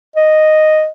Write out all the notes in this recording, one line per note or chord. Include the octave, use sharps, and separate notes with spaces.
D#5